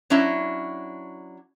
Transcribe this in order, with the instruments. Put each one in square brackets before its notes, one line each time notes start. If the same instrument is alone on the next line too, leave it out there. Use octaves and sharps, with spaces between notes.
[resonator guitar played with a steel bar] F#3 C#4 D4 E4